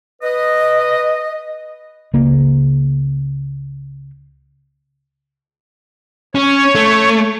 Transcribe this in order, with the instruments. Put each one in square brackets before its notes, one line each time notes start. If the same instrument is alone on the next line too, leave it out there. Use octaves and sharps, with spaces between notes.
[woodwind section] B4 D#5
[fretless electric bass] C#2 C#3 A#3
[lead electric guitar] C#4 [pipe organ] C#5
[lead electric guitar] A3